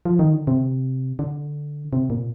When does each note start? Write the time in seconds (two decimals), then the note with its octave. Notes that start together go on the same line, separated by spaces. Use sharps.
0.05 F3
0.19 D#3
0.33 D3
0.47 C3
1.19 D3
1.93 C3
2.10 A#2